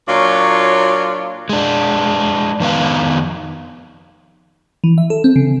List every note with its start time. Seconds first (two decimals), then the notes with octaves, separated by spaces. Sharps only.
0.08 A#2 F#3 D4 F4 C#5 F5
1.49 G#3 D4
2.60 F2 D#3 B3 B4 F5
4.84 E3
4.98 E5
5.10 A4
5.24 C4
5.36 C#3